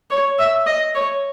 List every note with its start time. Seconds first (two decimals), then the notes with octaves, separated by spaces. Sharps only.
0.10 C#5
0.39 E5
0.66 D#5
0.95 C#5